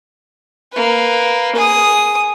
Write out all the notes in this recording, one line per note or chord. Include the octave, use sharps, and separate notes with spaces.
A#3 B4
G#4 D#6